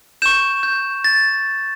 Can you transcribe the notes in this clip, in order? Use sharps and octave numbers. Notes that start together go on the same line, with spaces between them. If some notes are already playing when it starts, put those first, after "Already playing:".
C#6 G6 E7
G6
A6